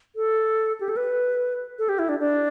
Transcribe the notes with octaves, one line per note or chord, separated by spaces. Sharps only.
A4
G4
A4
B4
A4
G4
E4
D4
D4